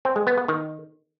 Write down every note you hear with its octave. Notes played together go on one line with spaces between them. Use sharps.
C4
G#3
B3
B3
D#3